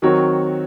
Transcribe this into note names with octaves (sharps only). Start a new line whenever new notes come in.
D#3 F#3 C4 F#4 C#5